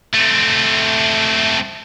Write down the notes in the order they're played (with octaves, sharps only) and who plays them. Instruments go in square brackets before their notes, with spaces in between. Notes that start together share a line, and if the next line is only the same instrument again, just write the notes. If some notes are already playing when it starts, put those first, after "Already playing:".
[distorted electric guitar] A3 C4